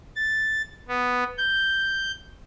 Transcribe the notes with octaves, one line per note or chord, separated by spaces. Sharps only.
A6
B3
G6